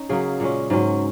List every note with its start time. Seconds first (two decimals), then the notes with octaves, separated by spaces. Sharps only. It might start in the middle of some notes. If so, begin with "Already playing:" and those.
Already playing: C#4 D#4
0.09 C#3 F#3 A#3 G#4
0.40 A#2 G#3 C#4
0.70 G#2 F#3 C#4